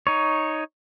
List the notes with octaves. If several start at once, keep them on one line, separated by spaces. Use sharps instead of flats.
D#4 C#5